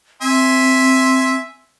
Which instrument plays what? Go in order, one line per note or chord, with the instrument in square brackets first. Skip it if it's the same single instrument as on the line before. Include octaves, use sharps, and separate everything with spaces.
[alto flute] C4 [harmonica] E5 G#5 C6